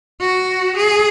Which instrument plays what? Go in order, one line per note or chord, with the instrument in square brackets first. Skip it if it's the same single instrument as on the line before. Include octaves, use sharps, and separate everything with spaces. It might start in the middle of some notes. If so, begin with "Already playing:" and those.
[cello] F#4
G#4